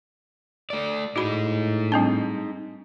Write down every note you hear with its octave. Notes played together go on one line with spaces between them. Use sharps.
A3 D5
A2 D#4 F#4 G#4 B5
G3 C4 D4